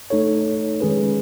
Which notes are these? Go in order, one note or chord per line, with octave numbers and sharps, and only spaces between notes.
A3 D#4 A4 C#5
D#3 G#3 C#4 G#4 B4